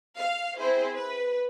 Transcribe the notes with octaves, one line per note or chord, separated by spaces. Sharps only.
F5
C4 E4 G#4 C5
B4